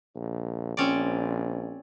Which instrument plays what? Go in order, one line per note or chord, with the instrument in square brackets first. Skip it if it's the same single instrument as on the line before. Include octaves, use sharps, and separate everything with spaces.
[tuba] A#1
[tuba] A#1 [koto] C4 C#4 D5